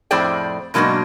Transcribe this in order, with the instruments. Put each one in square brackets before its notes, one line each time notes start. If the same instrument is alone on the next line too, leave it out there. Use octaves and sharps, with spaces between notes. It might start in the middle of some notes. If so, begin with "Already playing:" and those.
[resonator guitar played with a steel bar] F2 A2 G#4 C5 D5 G5
G#2 B2 F#3 A#3 D4 D#4